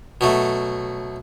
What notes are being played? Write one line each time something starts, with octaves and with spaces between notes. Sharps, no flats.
B2 F#3 A3